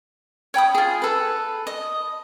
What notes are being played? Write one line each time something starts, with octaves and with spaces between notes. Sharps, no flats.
C#5 G5 B5 D#6
F4 G#4
A4 B4
D#5